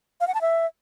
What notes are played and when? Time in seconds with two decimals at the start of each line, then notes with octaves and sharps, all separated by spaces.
0.21 F5
0.28 F#5
0.34 A5
0.41 E5